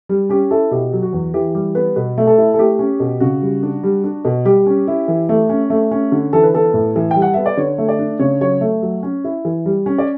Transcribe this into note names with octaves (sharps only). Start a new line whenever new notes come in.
G3
C#4 G4
E4 A4
B2 G4
F#3
F#4
E2
E3 G4
G3 G4
B3 B4
B2 B4
A3
A4
E4
A4
A3 G4
C#4
B2
C#3 F#4
G3
D4
G3
D4
B2
G3 G4
C#4
E4
E3
A3
C#4
A3
C#4
D3
E3 A4
B4
B3 A4
A2
E3
G3 G5
F#5
B3 E5
D5
D3 C#5
A3
D5
D4
C#3 C#5
F#3 C#5
A3
F#3
C#4
E4
E3
G3
C#4
D5